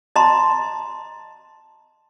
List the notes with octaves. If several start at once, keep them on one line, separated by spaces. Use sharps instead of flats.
D#5 A5 A#5 C6